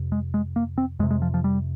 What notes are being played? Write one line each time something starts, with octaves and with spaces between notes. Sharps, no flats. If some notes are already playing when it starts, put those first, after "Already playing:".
Already playing: F2 C3
G#3
G#3
A#3
C4
F2 C3 G#3
G#3
F3
F3
G3